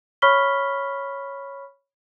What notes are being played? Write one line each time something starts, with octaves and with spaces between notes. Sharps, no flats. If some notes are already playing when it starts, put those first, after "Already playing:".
C#5 B5 C#6 F6 B6 G7